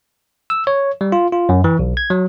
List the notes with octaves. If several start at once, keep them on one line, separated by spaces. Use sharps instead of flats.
E6
C#5
G3
F4
F4
F#2
E3
B1
G#6
F#3